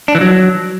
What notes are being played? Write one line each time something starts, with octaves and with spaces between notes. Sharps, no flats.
D4
E3
F#3